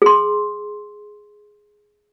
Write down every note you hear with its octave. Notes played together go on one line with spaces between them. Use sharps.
G#4 C6